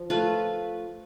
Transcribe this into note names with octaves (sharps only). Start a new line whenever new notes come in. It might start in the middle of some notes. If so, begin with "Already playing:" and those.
Already playing: F3
A3 F4 B4